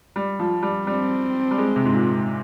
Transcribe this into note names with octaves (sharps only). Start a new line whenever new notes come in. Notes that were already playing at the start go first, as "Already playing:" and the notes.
G3
F3
G3
G3 C4
G3
G#3
C3
G#2
A#2
G#2